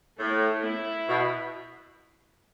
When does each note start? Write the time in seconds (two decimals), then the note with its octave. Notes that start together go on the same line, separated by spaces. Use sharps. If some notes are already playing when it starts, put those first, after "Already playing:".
0.19 A2 A3
0.64 E4
1.09 B2